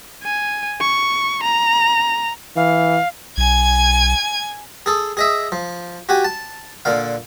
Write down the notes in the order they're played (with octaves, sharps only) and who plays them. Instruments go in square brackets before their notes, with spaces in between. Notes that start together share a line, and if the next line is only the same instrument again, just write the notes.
[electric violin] G#5
C#6
A#5
[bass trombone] E3 [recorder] F5
[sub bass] B1 [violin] G#5 G#6
[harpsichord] G#4 A4
G#4 D#5 E5
F3
F#4 G4 G#5
A5
A#2 D3 F5